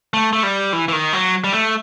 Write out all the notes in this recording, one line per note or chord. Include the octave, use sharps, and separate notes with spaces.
A3
A3
G3
E3
E3
D#3
F#3
G3
A3